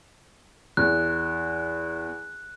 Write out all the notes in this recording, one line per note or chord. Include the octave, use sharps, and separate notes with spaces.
E2 F#6